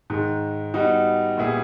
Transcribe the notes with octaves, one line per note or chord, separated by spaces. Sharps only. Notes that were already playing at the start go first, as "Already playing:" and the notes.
G#2 D#3 G#3
G3 B3 D#4 F#4
A#2 G3 B3 E4 G#4